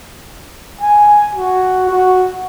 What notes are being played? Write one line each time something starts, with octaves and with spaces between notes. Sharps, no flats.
G#5
F#4
F#4